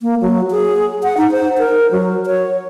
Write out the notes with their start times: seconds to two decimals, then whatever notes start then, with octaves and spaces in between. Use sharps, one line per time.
0.01 A#3
0.21 F#3
0.51 G#4
1.03 F#5
1.17 D#4
1.31 C5
1.58 A#4
1.92 F#3
2.26 C#5